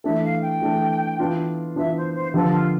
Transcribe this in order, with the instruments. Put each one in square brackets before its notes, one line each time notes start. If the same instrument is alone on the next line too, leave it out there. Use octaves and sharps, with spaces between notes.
[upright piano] E3 A3 D4 A4 [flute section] E5
[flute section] F5
G5
[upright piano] E3 A3 D4 A4
E3 B3 D4 F4
[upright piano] E3 B3 D4 F4 [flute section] E5
[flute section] C5
C5
[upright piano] D3 F3 B3 D4 G4 [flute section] A4
[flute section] F4